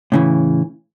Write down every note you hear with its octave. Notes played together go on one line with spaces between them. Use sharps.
A2 C#3 E3